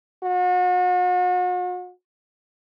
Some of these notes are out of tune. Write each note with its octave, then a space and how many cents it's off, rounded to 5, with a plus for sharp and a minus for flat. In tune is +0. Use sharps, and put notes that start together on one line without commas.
F#4 -40